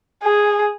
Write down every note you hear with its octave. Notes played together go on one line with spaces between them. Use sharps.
G#4